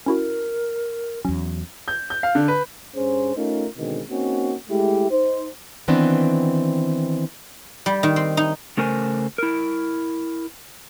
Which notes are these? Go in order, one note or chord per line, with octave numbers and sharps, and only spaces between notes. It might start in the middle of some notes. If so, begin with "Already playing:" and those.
C#4 E4 F#4 A#4
E2 F#3 C#4
G6
G6
F5
D3
B4
G2 C#4 G#4 C5
A3 C#4 D#4 F4 A#4
B2 D3 D#3 G#3 C4
A#3 C4 C#4 D#4 F#4
G#3 A3 E4 G4
D#4 C5
D#3 E3 B3 C4 D4
G3
D#3
C4
D#4
C#3 A3 A#4 C5 G#5
E4 A#4